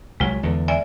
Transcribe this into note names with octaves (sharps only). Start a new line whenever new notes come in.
C2 F#3 G#3 F4
E2 D3
D5 E5 G#5